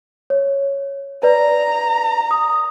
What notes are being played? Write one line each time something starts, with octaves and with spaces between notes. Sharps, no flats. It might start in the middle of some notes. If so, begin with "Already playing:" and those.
C#5
B4 D5 A#5
D#6